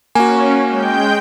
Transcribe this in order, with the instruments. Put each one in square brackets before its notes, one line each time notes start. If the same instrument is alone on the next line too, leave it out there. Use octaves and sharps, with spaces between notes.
[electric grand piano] A#3 F#4 [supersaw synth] C#4 [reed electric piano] G#5
[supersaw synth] G#3 G5 G6